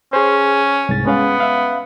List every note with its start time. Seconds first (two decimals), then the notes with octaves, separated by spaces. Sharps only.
0.13 C#4 G#4 C5
0.89 C2 G#2 A6
1.06 G#3 B3 C#4 F5
1.40 E5 F5